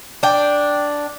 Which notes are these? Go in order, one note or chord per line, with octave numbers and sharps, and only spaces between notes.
D4 G5